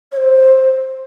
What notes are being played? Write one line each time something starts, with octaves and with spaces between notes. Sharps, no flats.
C#5
C5